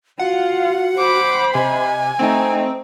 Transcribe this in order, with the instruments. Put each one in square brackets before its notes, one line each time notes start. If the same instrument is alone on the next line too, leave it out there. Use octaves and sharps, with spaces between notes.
[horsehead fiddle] F4 F5 [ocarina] F#4 [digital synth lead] F#5
[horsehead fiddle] C5 B5 [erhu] D6
[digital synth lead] C3 [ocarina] D#5 [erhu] G#5
[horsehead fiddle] A3 D#4 [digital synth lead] C4 [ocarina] C5